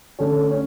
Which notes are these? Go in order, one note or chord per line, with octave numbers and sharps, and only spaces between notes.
D3 A3 C#4
C#4